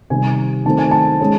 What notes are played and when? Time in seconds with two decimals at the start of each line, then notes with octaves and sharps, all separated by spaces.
0.10 C3 D#3 G3 C4 G#5
0.66 D#3 F#3 A3 C4 A5
0.79 G#5
0.91 A5
1.21 G#3 C#4